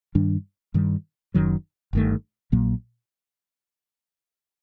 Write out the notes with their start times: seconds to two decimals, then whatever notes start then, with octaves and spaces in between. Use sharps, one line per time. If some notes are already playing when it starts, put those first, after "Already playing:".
0.15 G2 D#3 G3 D4
0.74 G2 D#3 G3
1.34 F#1 F#2 D#3 F#3
1.93 G1 G2 D#3 A3
2.52 A#1 A#2 F#3 A#3